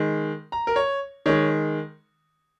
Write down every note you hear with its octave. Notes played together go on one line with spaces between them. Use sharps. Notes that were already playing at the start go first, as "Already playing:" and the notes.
Already playing: D#3 G#3
A#5
A#4
C#5
D#3 G#3 C#5